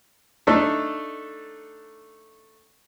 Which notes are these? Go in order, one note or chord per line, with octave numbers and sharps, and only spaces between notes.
A3 D4 D#4 A4